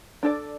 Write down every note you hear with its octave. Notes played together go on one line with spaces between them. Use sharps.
D4 A4 D5